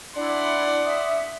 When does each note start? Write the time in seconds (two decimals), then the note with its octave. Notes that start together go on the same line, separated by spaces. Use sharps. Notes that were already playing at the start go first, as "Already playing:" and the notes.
0.16 D4 E4 D5 F#5 C6
0.86 E5 D#6